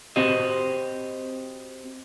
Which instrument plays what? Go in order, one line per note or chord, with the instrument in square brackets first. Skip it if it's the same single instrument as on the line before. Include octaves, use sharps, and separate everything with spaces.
[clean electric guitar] C4 F#4 G4 C5 D#5